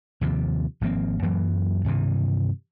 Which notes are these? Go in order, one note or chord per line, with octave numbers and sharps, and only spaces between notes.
D#2 C3 F3
G#1 F3 A#3 C4
F#2 E3 F#3 A#3
G2 C3 D#3 E3